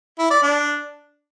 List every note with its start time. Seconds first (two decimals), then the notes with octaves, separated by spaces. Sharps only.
0.19 E4
0.31 D5
0.43 D4